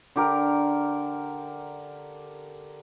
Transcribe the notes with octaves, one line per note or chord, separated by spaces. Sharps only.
D3 G4 A#4